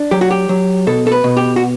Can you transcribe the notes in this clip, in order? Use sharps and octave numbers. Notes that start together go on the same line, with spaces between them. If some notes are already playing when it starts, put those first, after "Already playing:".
Already playing: D4
F#3 G4
F#4
G4
F#3
B2 A4
A4
B4
B2
G4
F#4